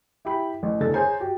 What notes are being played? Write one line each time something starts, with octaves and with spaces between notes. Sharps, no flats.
E4 G4 G5 B5
A1
E2 D3 A4 A6
G#4 C5 C#5 G#5 A#5
F#4 G4